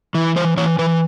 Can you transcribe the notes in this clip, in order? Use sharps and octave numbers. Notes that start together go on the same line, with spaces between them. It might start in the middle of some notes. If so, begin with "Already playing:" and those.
E3
E3 C5
E3 C#5
E3 B4